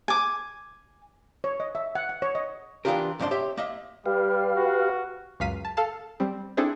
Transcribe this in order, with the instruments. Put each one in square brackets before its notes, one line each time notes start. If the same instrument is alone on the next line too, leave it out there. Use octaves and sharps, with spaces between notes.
[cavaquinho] G#5 D6
[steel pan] C#5
D#5
E5
F#5
F#5
C#5
D#5
[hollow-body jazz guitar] E3 B3 D4 F4 G4 A#4
F2 G#2 C#3 D4 C6
G4 C#5 E5 C6
A#3 D#5 E5
[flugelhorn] G3 [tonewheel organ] G4 B4 F5
[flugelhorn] F#4
[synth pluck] C#2 F#2 F5 B6 D#7
A5
A4 F5 A5
G3 C4
C4 D4 E4 G#4 A4